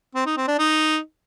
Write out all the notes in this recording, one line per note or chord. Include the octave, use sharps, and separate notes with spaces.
C4
D#4
C4
D4
D#4